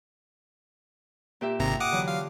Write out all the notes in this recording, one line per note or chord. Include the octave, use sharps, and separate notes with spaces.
A#2 G4 E5
G#1 C3 A#5
F#5 D6 D#6
D3 E3 F#3
F4 F5